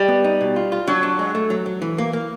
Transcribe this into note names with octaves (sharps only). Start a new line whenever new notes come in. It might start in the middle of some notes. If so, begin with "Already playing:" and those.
Already playing: G3
B3
D#4
B2
F4
F4
F#3 D4
D4
G#3
A3
F#3
F#3
E3
A#3
A#3